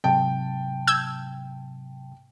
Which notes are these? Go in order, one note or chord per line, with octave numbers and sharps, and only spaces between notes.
G#2 C3 F#3 G5 A5
E6 G6 G#6